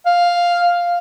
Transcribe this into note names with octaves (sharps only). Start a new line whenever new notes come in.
F5